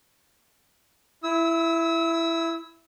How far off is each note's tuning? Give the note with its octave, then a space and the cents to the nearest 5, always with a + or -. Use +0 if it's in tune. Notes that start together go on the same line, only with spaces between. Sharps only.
E4 +10 E6 -30